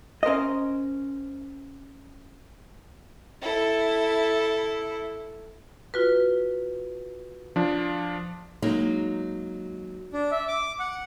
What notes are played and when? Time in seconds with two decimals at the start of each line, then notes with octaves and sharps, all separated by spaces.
0.23 C#4 A#4 C5 D#5
3.42 E4 A4
5.94 F4 F#4 B4
7.56 F3 D4
8.62 F#3 G#3 A#3 D#4
10.13 D4
10.31 E5
10.48 D6
10.80 F#5